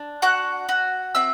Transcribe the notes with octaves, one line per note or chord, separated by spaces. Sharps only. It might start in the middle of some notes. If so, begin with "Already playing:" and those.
Already playing: D4
F#4 F#5 F#6
F#4
C4 E5 E6